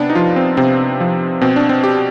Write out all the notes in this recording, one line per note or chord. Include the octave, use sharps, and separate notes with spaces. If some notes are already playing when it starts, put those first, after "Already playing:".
Already playing: C3 B3 D4
D#4
F3 F4
C4
C3 C4
F3
B2 C4
D4
C4
G4